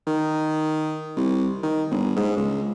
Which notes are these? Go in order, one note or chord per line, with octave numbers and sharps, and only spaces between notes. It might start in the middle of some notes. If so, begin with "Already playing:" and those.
D#3
C2
D#3
G1
G#2
C#2